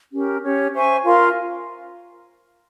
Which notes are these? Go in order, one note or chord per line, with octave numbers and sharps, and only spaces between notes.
C#4 G4 A#4
C#4 G4 C#5
C5 E5 G#5 C#6
F4 A#4 F5 C6